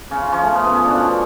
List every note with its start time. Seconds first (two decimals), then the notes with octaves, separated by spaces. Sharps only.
0.11 C#3 C#4
0.22 F4
0.32 F3 C#4
0.43 A3
0.53 C#3 B3
0.64 B3
0.74 F3 C#4
0.85 D4
0.95 B2 C#4